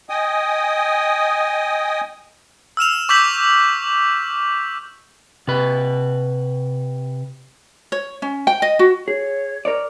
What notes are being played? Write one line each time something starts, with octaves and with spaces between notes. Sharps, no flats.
D#5 G5 G#5 D#6
E6 F6 E7 F7
C#6 D6 E6 G6 B6 F#7
C3 B4
C#5
C#4
G5
D#5
F#4
G#4 C#5
A#4 C#5 D5